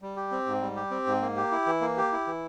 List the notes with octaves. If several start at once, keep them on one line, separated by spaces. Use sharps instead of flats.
G3
G4
C4
G#2
G3
G4
C4
G#2
A#3
G4
E4
E3
A#3
G4
E4
E3